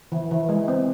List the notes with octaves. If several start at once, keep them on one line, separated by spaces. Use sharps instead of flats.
E3
E3
G#3
C4